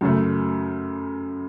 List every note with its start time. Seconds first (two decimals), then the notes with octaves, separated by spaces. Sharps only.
0.01 F#2 C#3 A3